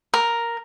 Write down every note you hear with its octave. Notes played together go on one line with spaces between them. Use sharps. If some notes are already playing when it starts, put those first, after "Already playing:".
A#4